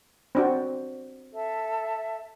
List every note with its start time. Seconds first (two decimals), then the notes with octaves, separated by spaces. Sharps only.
0.35 C4 D4 F#4
1.34 A4 E5